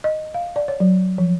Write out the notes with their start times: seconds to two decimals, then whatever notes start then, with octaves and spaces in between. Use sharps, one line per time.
0.04 D#5
0.34 F5
0.56 D5
0.68 C#5
0.80 F#3
1.18 F3